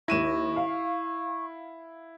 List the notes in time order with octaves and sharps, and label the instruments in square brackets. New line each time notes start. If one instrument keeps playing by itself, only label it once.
[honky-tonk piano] D#2 A#6 [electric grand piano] E4 D#7 E7 [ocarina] C#6
[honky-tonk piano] F5